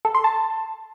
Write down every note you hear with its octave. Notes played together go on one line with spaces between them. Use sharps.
A4
C6
A5